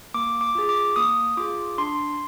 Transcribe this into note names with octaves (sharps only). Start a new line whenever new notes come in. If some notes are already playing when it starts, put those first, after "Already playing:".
A#3 D6
D6
F4 G#4
D6
A#3 D#6
F4 G#4 D6
D4 C6